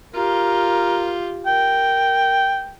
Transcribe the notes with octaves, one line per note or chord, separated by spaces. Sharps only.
F4 G4 A#4
A#4 G5